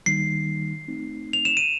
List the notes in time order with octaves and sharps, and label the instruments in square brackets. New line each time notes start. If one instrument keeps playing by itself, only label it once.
[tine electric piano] D#3 G3 A#3 D#4 [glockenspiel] C7
[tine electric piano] A3 C4 D#4
[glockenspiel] F7
E7
D#7